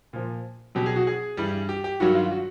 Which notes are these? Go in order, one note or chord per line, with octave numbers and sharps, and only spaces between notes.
A#2 F3
B2 F#3 G4
G#4
F#4
G#4
G2 E3 G3
G4
G4
G2 D#3 F#3 F#4
F4
F#4